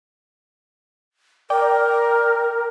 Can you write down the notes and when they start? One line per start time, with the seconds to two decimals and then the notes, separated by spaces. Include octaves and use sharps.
1.50 A#4 D5 G5 D6